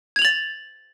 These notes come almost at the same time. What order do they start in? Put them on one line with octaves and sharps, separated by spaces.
G#6 F7 F#7 A6